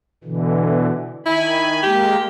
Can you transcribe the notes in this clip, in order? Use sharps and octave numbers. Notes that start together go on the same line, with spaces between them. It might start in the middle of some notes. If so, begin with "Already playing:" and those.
B2 D3 E3
D#3 E4 G#5 B5
G#3 A#3 G4